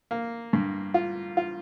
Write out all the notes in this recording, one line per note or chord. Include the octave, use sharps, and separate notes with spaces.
A#3
G2
F4
F4